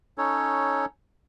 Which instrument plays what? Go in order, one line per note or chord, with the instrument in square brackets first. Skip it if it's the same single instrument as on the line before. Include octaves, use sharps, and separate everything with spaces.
[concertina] C#4 D#4 A4 C#5